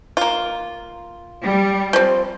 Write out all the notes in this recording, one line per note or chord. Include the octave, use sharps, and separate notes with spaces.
A#3 F4
G3
F3 C4